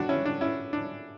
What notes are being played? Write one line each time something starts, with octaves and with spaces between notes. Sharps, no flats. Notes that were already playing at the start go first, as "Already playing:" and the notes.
Already playing: G2 E3 B3 D4 F#4
C#4 E4
D4
C#4 E4
D4